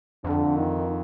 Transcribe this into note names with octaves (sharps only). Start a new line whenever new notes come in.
F2 D3
D#3